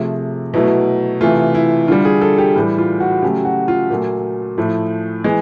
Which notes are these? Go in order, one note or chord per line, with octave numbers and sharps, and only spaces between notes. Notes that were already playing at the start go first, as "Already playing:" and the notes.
Already playing: C3 F3 A3 G#4
B2 F#3 A3 E4
C3 E3 A3 F4
E4
D3 G3 F4
G#4
A4
G4
A2 E3 G3
F4
F#4
C#3 F#3 A3 G4
F#4
F4
A#2 F#3 A3
A2 F3 A3
E3 G#3